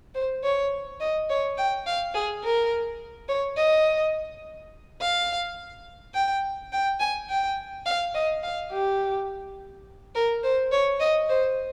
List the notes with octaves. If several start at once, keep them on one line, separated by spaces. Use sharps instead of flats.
C5
C#5
D#5
C#5
G5
F5
G#4
A#4
C#5
D#5
F5
G5
G5
G#5
G5
F5
D#5
F5
G4
A#4
C5
C#5
D#5
C5